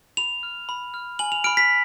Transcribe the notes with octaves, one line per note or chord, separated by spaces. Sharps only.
B5 F7
F6
B5
F6
G#5 F#7
F7
B5 F6 D7
B6